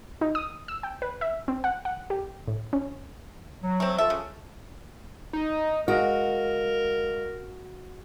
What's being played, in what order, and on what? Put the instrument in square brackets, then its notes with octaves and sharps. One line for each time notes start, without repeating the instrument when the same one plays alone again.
[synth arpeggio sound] D#4
D#6
E6
G5
B4
E5
C4
F#5
F#5
G4
A2
C#4
[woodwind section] F#3
[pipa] A3 C4
[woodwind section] F4 A4 A5 [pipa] E5
[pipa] C#3
[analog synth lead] D#4
[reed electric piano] G#3 D#5 F5 [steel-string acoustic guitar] F#4 [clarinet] A#4